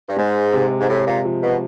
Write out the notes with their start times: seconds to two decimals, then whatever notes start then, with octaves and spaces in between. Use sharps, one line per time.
0.08 G2
0.17 G#2 G#3
0.53 C3
0.80 G#2
0.89 A2 C3
1.06 A#2
1.25 F3
1.43 B2